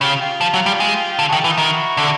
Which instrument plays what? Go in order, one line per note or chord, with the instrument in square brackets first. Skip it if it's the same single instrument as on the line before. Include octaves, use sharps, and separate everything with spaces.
[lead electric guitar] C#3 [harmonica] F4 G4
[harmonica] F4 G4
[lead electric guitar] F3
F#3
G3
G#3
D3
[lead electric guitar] D#3 [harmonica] F#4 G#4
[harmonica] G4 A4
[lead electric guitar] E3
[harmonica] D#4 F4
[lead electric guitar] D#3 [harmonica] E4 F#4
[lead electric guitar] D3